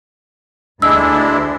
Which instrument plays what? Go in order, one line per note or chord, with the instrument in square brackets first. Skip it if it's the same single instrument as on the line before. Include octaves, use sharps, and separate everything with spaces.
[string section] D2 [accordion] G#3 D4 E4 [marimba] E6